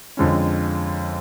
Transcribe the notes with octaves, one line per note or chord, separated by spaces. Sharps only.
F2 D3 G#3 C#4